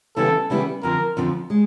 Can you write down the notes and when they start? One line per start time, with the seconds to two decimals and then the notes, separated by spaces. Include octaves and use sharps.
0.16 C#3 E3 G3 B3 E4 A4
0.50 C#3 E3 G3 B3 E4
0.83 F2 D3 F3 A#4
1.17 F2 D3 F3
1.50 G#3